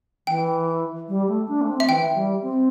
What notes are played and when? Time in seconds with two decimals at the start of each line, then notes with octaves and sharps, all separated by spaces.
0.27 E3 G5
1.09 G3
1.28 A3
1.48 D4
1.62 A3
1.68 C4
1.80 E5
1.88 E3 G5
2.15 G3
2.42 C4